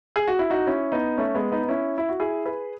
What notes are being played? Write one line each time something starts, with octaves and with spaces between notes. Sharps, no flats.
G#4
F#4
E4
D#4 F#4
C#4 E4
B3 D#4
A3 C#4
G#3 B3
B3 D#4
D#4
C#4 E4
E4
F#4
E4 G#4
G#4 B4